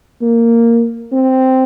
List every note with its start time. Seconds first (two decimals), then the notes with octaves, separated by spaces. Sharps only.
0.21 A#3
1.12 C4